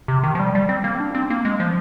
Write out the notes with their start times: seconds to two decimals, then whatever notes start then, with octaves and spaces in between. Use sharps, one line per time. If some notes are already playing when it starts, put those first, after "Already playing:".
0.08 C3
0.24 D#3
0.35 F3
0.39 G3
0.55 G3
0.69 C4
0.84 A#3
0.95 C4
1.00 D4
1.15 C4
1.30 A#3
1.45 G#3
1.60 F3